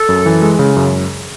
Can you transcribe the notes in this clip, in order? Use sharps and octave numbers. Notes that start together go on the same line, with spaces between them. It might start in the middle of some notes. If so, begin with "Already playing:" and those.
Already playing: A4
F#2
E3
G#3
C#3
F#2